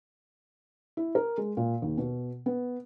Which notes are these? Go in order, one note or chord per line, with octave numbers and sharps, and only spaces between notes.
E4
A#4
G#3
A#2
D#2
B2
B3